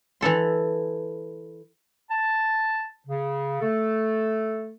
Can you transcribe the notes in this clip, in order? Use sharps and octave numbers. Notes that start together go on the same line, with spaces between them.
E3 E4 A4 C6
A5
C#3
A3 A4